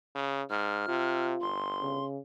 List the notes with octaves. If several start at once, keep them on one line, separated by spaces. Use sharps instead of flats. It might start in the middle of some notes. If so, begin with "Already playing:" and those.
C#3
G#2 F6
C3 F4
G1 C6
C#3